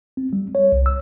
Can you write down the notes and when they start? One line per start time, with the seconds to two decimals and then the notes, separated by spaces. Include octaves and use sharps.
0.17 C4
0.33 G3
0.55 C#5
0.72 C2
0.86 E6